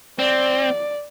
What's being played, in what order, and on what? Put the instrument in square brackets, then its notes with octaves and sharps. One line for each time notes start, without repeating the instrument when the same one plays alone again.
[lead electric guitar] C4 [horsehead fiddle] D5